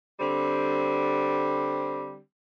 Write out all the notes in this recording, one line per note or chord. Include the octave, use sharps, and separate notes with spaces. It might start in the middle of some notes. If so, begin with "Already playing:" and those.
D3 G3 C4